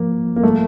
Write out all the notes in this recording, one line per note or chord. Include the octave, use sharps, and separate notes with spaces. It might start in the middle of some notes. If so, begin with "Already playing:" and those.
Already playing: F3 A#3
A#3
A3